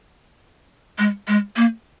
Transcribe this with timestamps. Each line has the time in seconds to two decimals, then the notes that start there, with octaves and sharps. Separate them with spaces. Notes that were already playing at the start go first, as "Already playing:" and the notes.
0.99 G#3
1.28 G#3
1.56 A#3